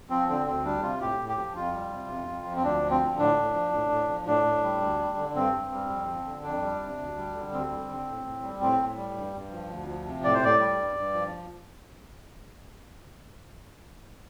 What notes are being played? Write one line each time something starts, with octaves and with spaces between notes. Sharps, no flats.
F3 C4
D3 C4
D2 C4
G3 D4
C3 F4
A2 G4
A2
G4
F3
F2 F4
G3
C3
F2
F2
F3
C4
D2 D4
F3
C4
D3
A2 D4
A2
F3
A2
A2
F3
A2 D4
A2
G3
D2
G3
D3
G2 C4
G2
G3
F2
F3
D3
F2 D4
G3
C3
D2
G3
D3
D2 C4
G3
D3
A2
A2
G3
A2 C4
A2
G3
G2
G2
F3
D2
F3
C3
A2 D5
C5
A2 D5
G3
G2
G2
F3